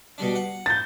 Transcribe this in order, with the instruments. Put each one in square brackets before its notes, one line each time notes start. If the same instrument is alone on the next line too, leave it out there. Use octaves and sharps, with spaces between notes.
[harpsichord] B2 G3 D4
F#5
[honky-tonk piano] G6 A6